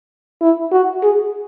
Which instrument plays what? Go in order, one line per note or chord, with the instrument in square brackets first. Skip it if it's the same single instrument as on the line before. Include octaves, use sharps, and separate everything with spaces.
[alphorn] E4
F#4
G#4